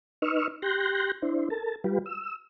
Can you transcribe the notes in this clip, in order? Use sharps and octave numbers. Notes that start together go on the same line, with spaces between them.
D#4 B4 D#5 C#6 E6 F6
G4 C6 F#6 G6 A#6
D4 E4 C5
A4 A#4 A5
G3 F4 G4 B4
E6